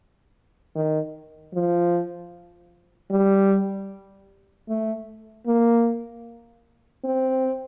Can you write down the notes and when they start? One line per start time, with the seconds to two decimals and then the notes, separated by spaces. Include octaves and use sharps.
0.76 D#3
1.54 F3
3.11 G3
4.69 A3
5.47 A#3
7.05 C4